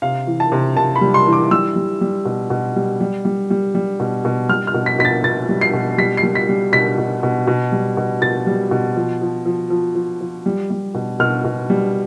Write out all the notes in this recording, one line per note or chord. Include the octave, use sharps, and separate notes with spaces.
C3 F5
E3
A5
C3
C3 A5
B5
G3
C6
E3
D6
G3 E6
G3
G3
B2
B2
G3
G3
G3
G3
G3
B2
B2
G3 F6
F6
B2
B6
B2 B6
A6
B2 A6
G3
C7
B2
G3 B6
C7
G3
B6
G3
B2 B6
B2
B2
B2
G3
B2
B2 A6
G3
B2
F3
F3
F3
F3
F3
F3
G3
G3
B2
B2 F6
B2
G3